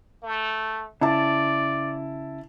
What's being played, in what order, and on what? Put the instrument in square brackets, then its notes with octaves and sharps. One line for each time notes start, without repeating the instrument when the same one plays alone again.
[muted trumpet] A3
[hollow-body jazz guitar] C#3 [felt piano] E4 A5 [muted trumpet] D5